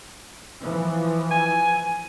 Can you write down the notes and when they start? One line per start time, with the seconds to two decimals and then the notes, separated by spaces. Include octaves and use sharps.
0.61 E3 F3
1.31 G#5